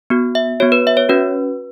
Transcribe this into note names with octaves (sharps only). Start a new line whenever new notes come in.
B3 F#4
E5
B3 F#4 C#5
B4
E5
C#5
C#4 F#4 B4